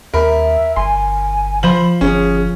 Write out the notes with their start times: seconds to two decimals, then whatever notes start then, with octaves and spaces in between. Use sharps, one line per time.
0.14 D#2 A#4 E5 B5
0.76 G1 G#5 C6
1.63 F3 C5 B5 F#7
2.01 G1 C#4 G#4